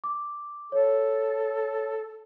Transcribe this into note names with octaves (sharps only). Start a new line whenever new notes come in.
D6
A4 C#5